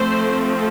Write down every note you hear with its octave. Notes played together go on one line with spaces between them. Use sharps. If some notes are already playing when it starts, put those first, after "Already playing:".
Already playing: F3 A3 C4 C5